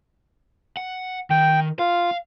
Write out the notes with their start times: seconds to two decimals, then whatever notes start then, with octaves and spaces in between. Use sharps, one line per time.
0.77 F#5
1.30 D#3 G5
1.79 F4 F5